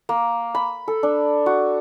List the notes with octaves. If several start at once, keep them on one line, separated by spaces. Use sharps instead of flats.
A#3
B5
A4
D4
F#4